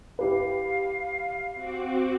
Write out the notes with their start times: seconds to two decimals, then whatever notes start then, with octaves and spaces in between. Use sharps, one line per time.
0.19 E4 G4 B4 F5
1.54 C4 F#4 D6